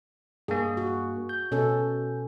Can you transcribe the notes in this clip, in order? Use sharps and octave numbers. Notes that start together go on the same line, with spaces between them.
G2 A#3 G#4
F#4
G6
B2 C#4 A4